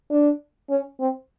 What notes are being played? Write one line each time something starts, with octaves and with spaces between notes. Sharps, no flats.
D4
C#4
C4